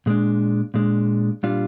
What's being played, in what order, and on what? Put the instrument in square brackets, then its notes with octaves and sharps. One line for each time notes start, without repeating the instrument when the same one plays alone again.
[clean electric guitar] A#2 G#3 D4
A#2 G#3 D4
A#2 G3 D4 F4